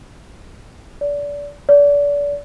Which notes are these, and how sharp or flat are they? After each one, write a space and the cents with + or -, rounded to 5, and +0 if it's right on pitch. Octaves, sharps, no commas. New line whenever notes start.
D5 -25
D5 -30